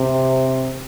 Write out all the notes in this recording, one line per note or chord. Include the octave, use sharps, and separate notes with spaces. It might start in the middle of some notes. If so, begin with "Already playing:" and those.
Already playing: C3